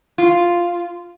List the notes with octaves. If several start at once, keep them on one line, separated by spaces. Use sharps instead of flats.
F4